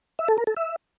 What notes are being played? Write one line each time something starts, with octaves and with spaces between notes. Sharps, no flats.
E5
A4
A#4
A4
E5